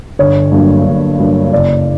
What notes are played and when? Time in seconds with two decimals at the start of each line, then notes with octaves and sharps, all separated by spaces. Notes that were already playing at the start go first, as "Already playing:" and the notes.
0.19 G1 C#5
0.52 G2 F#3 A#3
0.85 G1
1.19 G2 F#3 A#3
1.52 F#1 D5